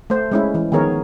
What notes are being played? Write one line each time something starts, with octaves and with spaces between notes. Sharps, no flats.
A3 C5
G#3 C#4 E4
E3
D#3 F3 B3 G#4 A#4 C#5